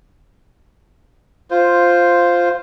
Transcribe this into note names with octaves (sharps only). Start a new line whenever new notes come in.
F4 C5